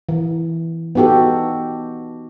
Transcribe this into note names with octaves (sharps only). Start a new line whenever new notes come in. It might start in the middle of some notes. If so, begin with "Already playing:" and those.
E3
B3 D#4 F#4 G4 A4